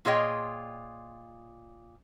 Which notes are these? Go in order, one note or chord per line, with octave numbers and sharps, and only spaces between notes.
A#2 F4 G#4 C#5 D#5 G5